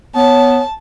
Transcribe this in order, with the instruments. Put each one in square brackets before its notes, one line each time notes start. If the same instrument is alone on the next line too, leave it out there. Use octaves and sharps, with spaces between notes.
[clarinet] B3 [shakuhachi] C#5 [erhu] A5